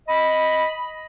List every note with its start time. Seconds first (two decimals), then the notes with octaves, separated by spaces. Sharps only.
0.08 D#5 B5